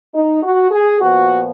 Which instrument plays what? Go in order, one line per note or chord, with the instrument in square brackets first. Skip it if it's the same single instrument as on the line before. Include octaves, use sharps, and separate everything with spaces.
[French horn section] D#4
F#4
G#4
A#2 F3 B3 F#4